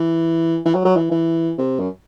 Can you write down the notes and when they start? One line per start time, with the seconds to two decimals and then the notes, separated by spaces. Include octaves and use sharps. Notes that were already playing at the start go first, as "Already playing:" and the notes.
Already playing: E3
0.65 E3
0.75 F#3
0.85 F#3
0.96 E3
1.11 E3
1.58 C3
1.79 F#2